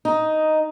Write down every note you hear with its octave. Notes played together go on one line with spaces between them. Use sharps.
D#4